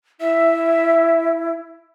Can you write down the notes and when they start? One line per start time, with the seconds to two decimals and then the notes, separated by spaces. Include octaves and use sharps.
0.20 E4 E5